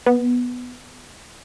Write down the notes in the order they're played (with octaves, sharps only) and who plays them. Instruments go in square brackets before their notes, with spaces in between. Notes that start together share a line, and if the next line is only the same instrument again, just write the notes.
[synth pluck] B3